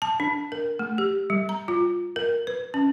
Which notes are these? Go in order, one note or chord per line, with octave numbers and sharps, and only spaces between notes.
A5
D4
A#4
A3
G4
G3
A#5
F4
A#4
B4
C#4